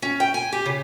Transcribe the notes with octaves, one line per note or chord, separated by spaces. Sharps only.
C#4
G5
G#5
G4
C#3